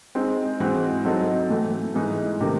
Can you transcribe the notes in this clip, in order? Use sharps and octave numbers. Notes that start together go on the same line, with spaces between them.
G#3 C4 D#4
G#2 E3 G#3 C4 F#4
F#3 C4 D#4 A4
A2 E3 A3
G#2 E3 G#3 D#4 G#4
C3 D#3 A3